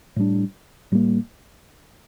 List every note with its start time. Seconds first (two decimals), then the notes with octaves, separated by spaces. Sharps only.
0.16 A2 G3 D4
0.92 A2 G3 A#3